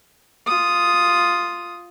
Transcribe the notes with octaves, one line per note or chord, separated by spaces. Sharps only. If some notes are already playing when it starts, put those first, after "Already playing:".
F4 D#6